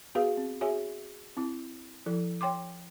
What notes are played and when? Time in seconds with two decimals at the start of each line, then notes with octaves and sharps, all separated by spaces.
0.15 B3 F#4 G#4 B4 F5
0.37 C4
0.61 F#4 G#4 C#5 E5 G#5
1.37 C4 E4
2.06 F3 E4 A4
2.41 C#5 G5 C6 D6